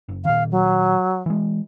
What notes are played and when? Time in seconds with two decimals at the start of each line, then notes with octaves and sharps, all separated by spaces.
0.09 F#1
0.25 A#2 D#3 F5
0.51 F#3
1.26 E3 G#3